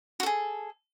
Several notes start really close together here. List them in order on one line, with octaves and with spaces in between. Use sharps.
F#4 A4 G#4